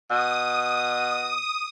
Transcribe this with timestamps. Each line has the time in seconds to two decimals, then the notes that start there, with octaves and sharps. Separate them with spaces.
0.10 B2 D#6